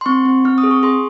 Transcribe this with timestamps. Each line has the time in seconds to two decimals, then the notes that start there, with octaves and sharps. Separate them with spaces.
0.01 C6
0.06 C4 C#6
0.25 C4
0.45 C4 F6
0.58 D#6
0.64 G#4
0.71 C#6
0.83 G#4 C6